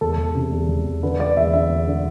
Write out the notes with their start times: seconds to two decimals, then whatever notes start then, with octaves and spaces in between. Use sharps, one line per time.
0.01 E2 A4
0.17 E2
0.35 C3
0.52 E2
0.69 E2
0.86 E2
1.03 D3 B4
1.19 D3 D5
1.37 E2 E5
1.53 D3 E5
1.70 E2
1.87 D3